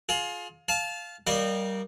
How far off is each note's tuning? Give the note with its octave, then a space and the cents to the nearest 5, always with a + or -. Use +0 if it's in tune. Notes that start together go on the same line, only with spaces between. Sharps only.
F4 +20 G#4 +30
F5 +0 A5 -25
G3 -20 A#3 +0 D#5 -30